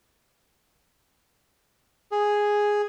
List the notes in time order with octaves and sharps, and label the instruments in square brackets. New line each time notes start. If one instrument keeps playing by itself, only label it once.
[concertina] G#4